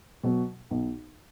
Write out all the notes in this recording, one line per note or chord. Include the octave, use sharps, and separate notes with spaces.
B2 F#3
B1